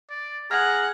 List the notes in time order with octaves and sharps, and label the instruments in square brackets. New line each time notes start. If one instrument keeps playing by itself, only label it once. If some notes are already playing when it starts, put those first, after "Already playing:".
[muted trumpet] D5
[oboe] G#4 [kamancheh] F#5 [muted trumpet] A#5 [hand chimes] F6